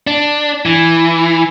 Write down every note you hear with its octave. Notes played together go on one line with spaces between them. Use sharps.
D4
E3